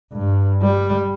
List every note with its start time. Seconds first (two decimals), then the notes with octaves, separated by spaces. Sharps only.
0.13 G2
0.62 G3